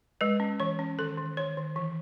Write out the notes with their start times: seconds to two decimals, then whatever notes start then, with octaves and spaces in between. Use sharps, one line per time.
0.21 G#3 B4
0.40 C#4
0.60 E3 C#5
0.79 C#4
0.99 D#3 A4
1.18 D#3
1.37 D#3 C#5
1.57 D#3
1.76 E3